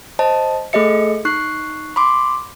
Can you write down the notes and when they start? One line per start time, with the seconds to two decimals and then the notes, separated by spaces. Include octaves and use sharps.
0.19 C5 D#5 A5
0.73 A3 G#4 A4 D#5 E5 C#7
1.25 D#4 C#6 F#6 C7
1.96 B5 C6 D6